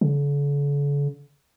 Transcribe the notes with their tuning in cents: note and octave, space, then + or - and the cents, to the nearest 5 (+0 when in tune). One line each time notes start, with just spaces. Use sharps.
D3 -45